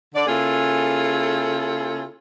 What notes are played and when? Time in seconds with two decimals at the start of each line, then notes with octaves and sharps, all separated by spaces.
0.14 D3 D5
0.27 C#3 A#3 E4 F4 G#4 A4